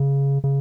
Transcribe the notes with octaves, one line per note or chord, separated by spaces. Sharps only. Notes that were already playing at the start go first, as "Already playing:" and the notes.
Already playing: C#3
C#3